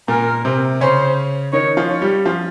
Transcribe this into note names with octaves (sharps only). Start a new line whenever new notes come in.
A#2 A#3 A#4
C3 C4
C#3 C#4 C5
D#3 D#4 C#5
F3 F4
C#5
G3 G4
F3 F4